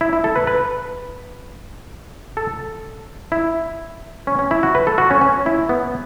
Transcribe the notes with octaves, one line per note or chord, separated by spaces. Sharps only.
E4
E4
A4
B4
B4
A4
E4
C#4
C#4
E4
F#4
B4
A4
F#4
C#4
C#4
E4
B3